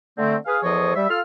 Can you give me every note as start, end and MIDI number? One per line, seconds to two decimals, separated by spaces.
0.18 0.35 50
0.18 0.35 57
0.18 0.35 60
0.46 0.57 68
0.46 0.57 71
0.46 0.57 77
0.63 0.94 40
0.63 0.94 53
0.63 0.94 69
0.63 0.94 72
0.63 0.94 73
0.63 0.94 75
0.96 1.09 55
0.96 1.09 76
1.09 1.20 65
1.09 1.20 69
1.09 1.20 77
1.09 1.20 89